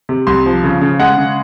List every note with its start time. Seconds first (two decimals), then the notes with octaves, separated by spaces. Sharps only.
0.09 C3
0.27 C2 C6
0.46 F3
0.63 C#3
0.81 C#3
1.00 G#3 F#5
1.18 C#3